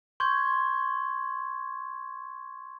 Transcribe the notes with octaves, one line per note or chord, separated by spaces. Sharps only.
C6 C#6 G6 G#6